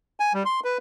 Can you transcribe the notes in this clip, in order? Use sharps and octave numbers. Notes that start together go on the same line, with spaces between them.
G#5
G3
C6
B4